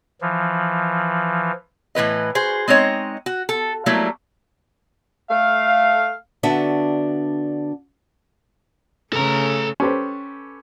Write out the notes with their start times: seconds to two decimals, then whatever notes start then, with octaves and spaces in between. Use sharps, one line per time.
0.21 E3 F3
1.95 A2 E3 B4 D#5
2.35 F#4 G#4 C5
2.68 G#3 C4 D#4 C#5 D#5
3.26 F#4
3.49 A4
3.86 F#3 G3 A3 A#3 E4
5.29 A3 F5
6.43 D3 B3 D4 F#4 E5
9.13 C#3 A3 A4 A#5
9.80 C#4 G4 A4 B4 C5